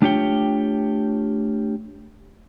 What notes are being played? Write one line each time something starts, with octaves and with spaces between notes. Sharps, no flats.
A3 D4 F4 G4 C#5 G5